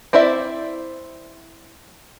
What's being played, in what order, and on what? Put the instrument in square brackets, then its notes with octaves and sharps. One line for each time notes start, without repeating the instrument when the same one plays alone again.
[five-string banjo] C4 E4 C5 D5 E5